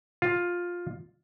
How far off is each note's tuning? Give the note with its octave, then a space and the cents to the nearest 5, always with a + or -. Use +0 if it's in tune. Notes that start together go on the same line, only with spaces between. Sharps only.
F4 +10